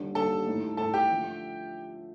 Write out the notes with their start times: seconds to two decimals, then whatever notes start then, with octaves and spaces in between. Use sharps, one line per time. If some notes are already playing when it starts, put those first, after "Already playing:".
Already playing: D#2 D3 G3 D4
0.15 D#2 D3 G3 D4 A4 A5
0.46 A2 A3 D#4
0.77 A2 A3 D#4 A4 A5
0.94 G4 G5
1.09 D3 F3 A3